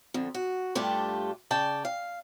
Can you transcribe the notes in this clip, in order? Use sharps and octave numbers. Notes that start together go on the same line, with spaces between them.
F2 D3
F#4
G2 A3 D4 F4 G4
C#3 D5 G5 A5
F5